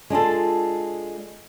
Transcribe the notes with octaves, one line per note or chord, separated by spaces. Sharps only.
G#3 D4 F4 A4